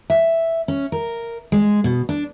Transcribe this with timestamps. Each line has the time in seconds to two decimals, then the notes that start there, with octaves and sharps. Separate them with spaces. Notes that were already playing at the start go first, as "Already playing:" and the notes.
0.10 E5
0.68 C#4
0.92 A#4
1.52 G#3
1.84 B2
2.09 D4